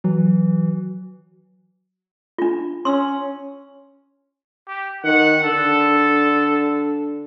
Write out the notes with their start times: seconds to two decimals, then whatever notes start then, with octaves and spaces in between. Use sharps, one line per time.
0.04 E3 F#3
2.38 D4 F4
2.85 C#4 C6 E6
4.67 G4
5.04 D#3 F#5
5.43 D3 A4